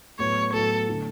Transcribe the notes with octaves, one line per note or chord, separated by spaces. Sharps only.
A2 F#3 B3 E4 C#5
A2 F#3 B3 E4 A4
D3 A3 E4